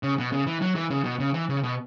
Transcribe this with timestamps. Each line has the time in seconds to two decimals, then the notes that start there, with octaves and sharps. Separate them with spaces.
0.03 C#3
0.19 B2
0.33 C#3
0.47 E3
0.62 F#3
0.75 E3
0.90 C#3
1.04 B2
1.20 C#3
1.34 E3
1.49 C#3
1.63 B2